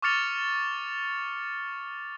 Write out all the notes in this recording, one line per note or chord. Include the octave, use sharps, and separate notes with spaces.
C#6 D6 F6 A6 C#7 F7